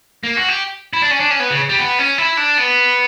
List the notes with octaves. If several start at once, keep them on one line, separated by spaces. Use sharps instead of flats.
A#3
F#4
G4
E4
D4
C#4
D4
C#4
B3
C#3
G3
B3
C#4
E4
D4
B3